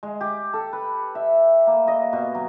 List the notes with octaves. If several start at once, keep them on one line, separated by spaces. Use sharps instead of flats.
G#3
G4
A4
B4
E5
A#3
D#5
B2
F#3